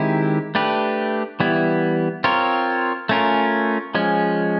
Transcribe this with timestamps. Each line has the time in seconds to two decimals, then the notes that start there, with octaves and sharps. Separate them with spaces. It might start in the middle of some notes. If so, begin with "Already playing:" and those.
Already playing: D#3 G#3 C4 E4 G4
0.55 A3 D4 G4 B4
1.40 E3 G3 B3 E4
2.24 C4 F4 A#4 C#5
3.09 A3 C#4 F4 A#4
3.95 F3 G#3 C#4